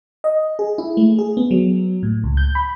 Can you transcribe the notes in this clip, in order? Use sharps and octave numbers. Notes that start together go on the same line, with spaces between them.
D#5
G#4
E4
A3
G#4
B3
F#3
A2
C#2
G6
B5